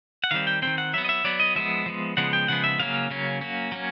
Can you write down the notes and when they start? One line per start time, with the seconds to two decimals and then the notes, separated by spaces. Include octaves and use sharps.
0.24 F#5
0.31 D#3 G3 C4 F5
0.47 G5
0.62 D#3 G3 C4 G5
0.78 F#5
0.94 F#3 B3 E5
1.05 D#5
1.09 E5
1.24 F#3 B3 D5
1.40 D#5
1.56 F3 G#3 B3 E5
1.86 F3 G#3 B3
2.17 C#3 F3 G#3 B3 F#5
2.33 G5
2.48 C#3 F3 G#3 B3 F#5
2.64 E5
2.79 C#3 F#3 A#3 C#4 F5
3.10 C#3 F#3 A#3 C#4
3.41 F#3 A#3 C#4
3.72 F#3 A#3 C#4